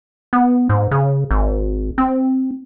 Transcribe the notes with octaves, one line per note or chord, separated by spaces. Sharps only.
B3
G#2
C#3
G#1
C4